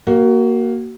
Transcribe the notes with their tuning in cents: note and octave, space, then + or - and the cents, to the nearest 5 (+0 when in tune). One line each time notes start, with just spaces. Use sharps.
A#3 +0 F#4 +25